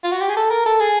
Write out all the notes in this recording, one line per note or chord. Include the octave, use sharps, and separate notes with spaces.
F4
F#4
G4
G#4
A4
A#4
A4
G#4